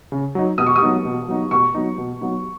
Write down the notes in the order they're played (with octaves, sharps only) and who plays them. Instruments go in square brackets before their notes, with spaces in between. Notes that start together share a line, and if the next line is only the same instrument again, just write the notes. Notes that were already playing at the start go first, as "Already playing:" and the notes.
[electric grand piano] C#3
F#3 D#4
[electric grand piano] B2 [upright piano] D#6
[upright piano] C#6
D#6
[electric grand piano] F#3 B3 D#4
B2
F#3 B3 D#4
[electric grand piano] B2 [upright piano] C#6
[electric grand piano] F#3 B3 D#4
B2
F#3 B3 D#4